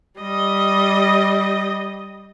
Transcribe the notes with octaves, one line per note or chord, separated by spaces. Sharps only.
G3 D#5